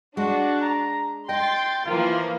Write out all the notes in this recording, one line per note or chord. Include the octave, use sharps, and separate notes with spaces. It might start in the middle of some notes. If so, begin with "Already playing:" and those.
G#3 D4 F#4
A#5
D#5 G5 C6 A6
E3 F3 A#3 F4